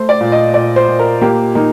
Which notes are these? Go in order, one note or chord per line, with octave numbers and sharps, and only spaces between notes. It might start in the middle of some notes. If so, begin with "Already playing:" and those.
Already playing: A3 C5
D5
A#2
D#5
A#2 D5
C5
A#2
A#4
A#3 G4
A#3 D#4